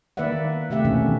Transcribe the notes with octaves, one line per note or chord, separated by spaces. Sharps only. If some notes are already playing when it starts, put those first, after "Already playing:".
D#3 A#3 B4 D5 E5 F#5
C3 A3 G4 E5 F#5
B2 D#3 E3 A#3 C#4